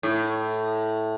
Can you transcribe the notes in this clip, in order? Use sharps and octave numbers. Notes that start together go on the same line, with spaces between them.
A2